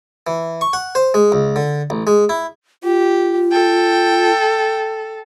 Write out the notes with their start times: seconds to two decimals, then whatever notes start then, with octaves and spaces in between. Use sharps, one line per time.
0.27 E3
0.61 C#6
0.73 F#5
0.95 C5
1.14 G#3
1.32 C#2
1.56 D3
1.90 A1
2.07 G#3
2.29 E4
2.84 F4 G4
3.52 A4 G5